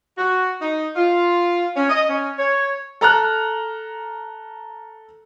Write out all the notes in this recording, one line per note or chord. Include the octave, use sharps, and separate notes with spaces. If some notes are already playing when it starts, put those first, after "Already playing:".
F#4
D#4
F4
C#4
D#5
C#4
C#5
A4 A#5 F6 F#6